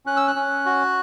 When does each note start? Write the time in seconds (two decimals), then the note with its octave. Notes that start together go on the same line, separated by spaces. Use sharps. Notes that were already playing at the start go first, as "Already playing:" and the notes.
0.06 C#4 F#6
0.17 E6
0.28 F#6
0.35 C#4
0.66 F#4